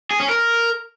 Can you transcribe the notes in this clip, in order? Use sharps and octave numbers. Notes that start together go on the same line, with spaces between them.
G#4
C#4
A#4